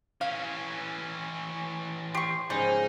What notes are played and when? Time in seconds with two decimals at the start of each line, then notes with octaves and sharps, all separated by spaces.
0.21 E3 C#4 F5
2.15 G4 C6 C#6
2.50 G#2 C#3 F3 G3 D#4 G#5